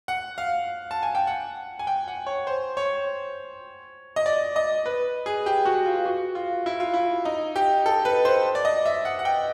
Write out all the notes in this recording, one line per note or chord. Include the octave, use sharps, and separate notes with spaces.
F#5
F5
A5
G#5
G5
F#5
G#5
G5
F#5
C#5
C5
C#5
D#5
D5
D#5
B4
G#4
G4
F#4
F4
F#4
F4
E4
F4
E4
D#4
G4
A4
B4
C5
D5
D#5
E5
F#5
F#5
G5